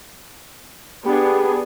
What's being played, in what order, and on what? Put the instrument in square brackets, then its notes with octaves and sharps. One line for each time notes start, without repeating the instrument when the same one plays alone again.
[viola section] B3 D4 G#4 [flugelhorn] G4